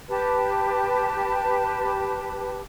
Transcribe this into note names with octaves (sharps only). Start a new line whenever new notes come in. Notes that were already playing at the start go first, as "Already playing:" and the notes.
G4 B4 A5